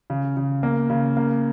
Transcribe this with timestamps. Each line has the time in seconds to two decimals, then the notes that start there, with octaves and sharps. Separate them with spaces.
0.10 C#3
0.37 C#3
0.63 A#3
0.90 C#3
1.17 A#3